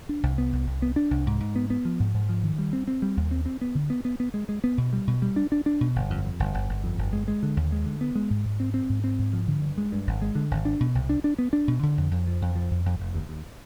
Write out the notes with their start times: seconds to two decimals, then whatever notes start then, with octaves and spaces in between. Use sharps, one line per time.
0.09 D4
0.23 C2
0.38 B3
0.53 C2
0.67 C2
0.82 B3
0.96 D4
1.11 C2
1.27 G#2
1.40 G#2
1.56 B3
1.70 B3
1.85 F3
2.00 G#2
2.14 G#2
2.29 F3
2.43 D#3
2.58 G3
2.73 C4
2.88 C4
3.02 G3
3.17 D#2
3.31 C4
3.46 C4
3.61 B3
3.75 D3
3.90 B3
4.05 B3
4.20 B3
4.34 G#3
4.49 G#3
4.64 B3
4.78 B2
4.93 G3
5.07 B2
5.22 G3
5.36 D4
5.52 D4
5.66 D4
5.81 B2
5.96 G1
6.10 F2
6.25 F2
6.40 G1
6.54 G1
6.69 G1
6.84 F2
6.98 G1
7.13 G#3
7.28 G#3
7.43 D3
7.57 D#2
7.72 G#3
7.86 D3
8.01 B3
8.15 G#3
8.30 G#2
8.45 G#2
8.60 C4
8.74 C4
8.89 G#2
9.04 C4
9.19 G#2
9.33 F3
9.48 D3
9.62 G2
9.78 G#3
9.92 G2
10.07 G#1
10.22 G#3
10.35 D3
10.51 G#1
10.65 D4
10.80 B2
10.95 C2
11.09 D4
11.24 D4
11.38 B3
11.53 D4
11.68 B2
11.83 D3
11.98 F2
12.11 F2
12.27 F3
12.42 F2
12.56 F3
12.71 F2
12.86 F2
13.00 F1
13.14 D#2
13.29 D#2